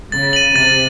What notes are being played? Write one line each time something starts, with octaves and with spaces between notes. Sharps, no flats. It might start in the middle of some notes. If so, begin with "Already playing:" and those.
C#3 A6
D#7 F#7
C3 A6